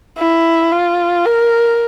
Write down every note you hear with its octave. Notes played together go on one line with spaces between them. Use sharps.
E4
F4
A#4